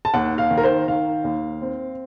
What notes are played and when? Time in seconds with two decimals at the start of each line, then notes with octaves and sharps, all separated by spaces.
0.05 A5
0.14 D#2 F#5
0.38 F5
0.51 D#3
0.57 A#4
0.63 C5
0.88 D#3 F5
1.24 D#2
1.62 C4